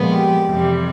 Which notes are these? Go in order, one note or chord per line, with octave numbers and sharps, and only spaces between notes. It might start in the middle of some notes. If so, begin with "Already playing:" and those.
Already playing: A#2 F3 G#3 B3
G4
F2 C3 E3 G3